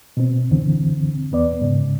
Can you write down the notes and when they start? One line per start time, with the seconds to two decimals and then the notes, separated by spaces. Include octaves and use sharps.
0.17 B2 C4
0.51 C#2 F#2 D3 E3 C4
1.32 E2 B3 D5
1.61 G#2 C#3